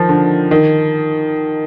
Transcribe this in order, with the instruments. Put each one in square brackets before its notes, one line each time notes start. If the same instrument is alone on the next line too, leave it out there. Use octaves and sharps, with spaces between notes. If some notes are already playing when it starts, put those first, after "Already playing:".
Already playing: [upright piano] D#3 F3
D3
D#3